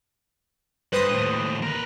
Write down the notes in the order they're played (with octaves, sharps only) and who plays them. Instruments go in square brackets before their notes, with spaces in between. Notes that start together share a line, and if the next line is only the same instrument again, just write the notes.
[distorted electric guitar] G2 [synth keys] B4 C5 D#6
[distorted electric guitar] D#2 A2
A#4 B4